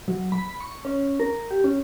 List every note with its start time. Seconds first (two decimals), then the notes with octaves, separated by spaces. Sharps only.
0.08 F#3
0.32 B5
0.61 C#6
0.85 C#4
1.20 A#4
1.51 G4
1.64 C#4